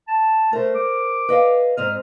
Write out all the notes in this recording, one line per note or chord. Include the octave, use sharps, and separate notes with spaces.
A5
A3 A#4 C5
D6
B4 D#5 F5
G#2 C4 D#5 F6